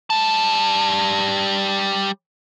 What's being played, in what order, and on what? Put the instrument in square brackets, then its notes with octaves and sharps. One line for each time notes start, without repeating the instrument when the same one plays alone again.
[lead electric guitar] G3 A5